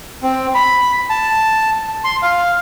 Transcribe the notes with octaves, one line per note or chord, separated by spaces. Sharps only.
C4
B5
A5
C6
F5